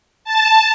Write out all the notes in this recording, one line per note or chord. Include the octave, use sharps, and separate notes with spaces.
A5